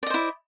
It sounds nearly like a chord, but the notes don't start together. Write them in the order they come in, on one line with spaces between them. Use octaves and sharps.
D5 D#5 C5 E4